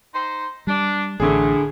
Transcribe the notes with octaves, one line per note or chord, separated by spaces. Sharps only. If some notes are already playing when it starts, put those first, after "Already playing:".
D#4 C5
G3 D4
A1 A2 D3 G#4